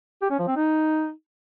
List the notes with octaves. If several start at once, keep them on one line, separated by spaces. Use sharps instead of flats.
G4
C#4
F3
C4
D#4